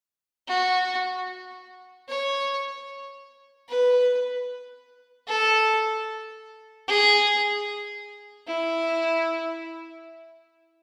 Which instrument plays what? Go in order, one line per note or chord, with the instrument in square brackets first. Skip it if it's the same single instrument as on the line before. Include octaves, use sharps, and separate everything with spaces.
[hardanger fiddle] F#4
C#5
B4
A4
G#4
E4